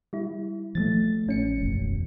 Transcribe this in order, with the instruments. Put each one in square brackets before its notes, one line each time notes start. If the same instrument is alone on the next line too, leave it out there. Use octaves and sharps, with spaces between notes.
[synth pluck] G3 E4
[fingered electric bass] F3 F#3 A3 [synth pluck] A6
[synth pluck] A1 C#4 C#7
[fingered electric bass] E1 F#2